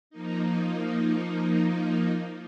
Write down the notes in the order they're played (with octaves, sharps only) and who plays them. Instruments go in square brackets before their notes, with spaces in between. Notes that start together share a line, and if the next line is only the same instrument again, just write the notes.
[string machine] F3 A#3 D#4